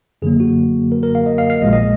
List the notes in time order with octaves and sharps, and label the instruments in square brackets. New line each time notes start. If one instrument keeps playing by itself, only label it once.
[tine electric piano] F#2 D3 F#3 A#3 G#4
F#4
A#4
A#4
F5
D#5
F5
F5
A#1 A#2 G#3 D#5
D#5